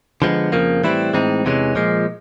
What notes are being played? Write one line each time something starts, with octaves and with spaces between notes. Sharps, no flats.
D3 F3 G#3 B3
F2 C#3 F3 A#3
A2 E3 G3 C4 E4
A2 E3 G#3 C4 D#4
E2 C3 E3 G#3 C#4
A#2 F3 G#3